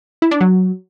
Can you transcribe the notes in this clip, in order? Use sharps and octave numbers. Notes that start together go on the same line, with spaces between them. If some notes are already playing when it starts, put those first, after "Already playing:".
E4
D4
F#3